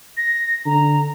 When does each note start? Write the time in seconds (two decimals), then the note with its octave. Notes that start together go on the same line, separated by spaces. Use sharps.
0.17 A#6
0.66 D3 A#5